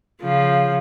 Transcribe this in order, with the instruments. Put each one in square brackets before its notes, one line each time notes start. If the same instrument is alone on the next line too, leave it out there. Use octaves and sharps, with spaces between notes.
[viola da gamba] C#3 F3